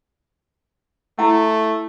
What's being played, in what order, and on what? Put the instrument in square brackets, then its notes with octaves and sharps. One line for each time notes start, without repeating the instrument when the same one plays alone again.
[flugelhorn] A3 [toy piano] E4 F#5